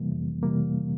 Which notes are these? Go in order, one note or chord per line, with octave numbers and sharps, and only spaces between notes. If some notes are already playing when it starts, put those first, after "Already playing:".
Already playing: F2 C3 E3 G3 A#3
F2
C3 E3 G3 A#3